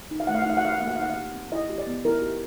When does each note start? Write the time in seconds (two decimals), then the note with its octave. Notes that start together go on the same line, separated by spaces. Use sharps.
0.11 D#4
0.20 F5
0.27 A3 F#5
0.35 F5
0.42 F#5
0.46 D#4 F5
0.57 F#5
0.64 G4 F5
0.72 F#5
0.80 A#3 F5
0.88 F#5
0.95 F5
0.99 D#4 F#5
1.10 F5
1.17 G4
1.34 C4
1.52 E4 D#5
1.70 G4
1.78 D5
1.87 B3
2.05 E4 A#4
2.22 G4